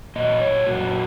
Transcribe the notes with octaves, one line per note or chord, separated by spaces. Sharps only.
A#2 F#3 A#3 D#5
C#5
A#2 F#3 A#3 F#4